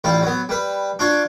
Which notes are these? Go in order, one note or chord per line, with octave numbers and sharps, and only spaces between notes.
A1 G3 F4
F#3 B3
G3 B4
D4 F4 C#5